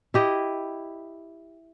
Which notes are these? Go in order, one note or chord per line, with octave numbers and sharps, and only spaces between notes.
E4 G4 D#5